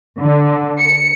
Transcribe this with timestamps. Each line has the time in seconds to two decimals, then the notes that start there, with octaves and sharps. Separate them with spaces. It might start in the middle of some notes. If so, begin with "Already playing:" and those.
0.19 D3
0.80 C#7